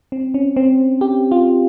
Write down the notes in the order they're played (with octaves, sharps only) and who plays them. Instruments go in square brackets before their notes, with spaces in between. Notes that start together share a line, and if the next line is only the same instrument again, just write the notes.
[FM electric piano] C4
C#4
C4
G4
F4